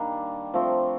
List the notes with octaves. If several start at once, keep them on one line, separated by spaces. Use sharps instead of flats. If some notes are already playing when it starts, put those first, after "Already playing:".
Already playing: D#3 G3 A#3 D4
F3 A3 C4